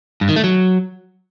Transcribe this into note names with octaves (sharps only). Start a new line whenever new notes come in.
G2
D#3
A3
F#3